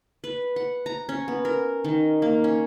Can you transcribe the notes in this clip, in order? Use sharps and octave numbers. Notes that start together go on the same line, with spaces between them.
B4
F#5
A#5
C#4
B3
A#4
D#3
A#3
C#4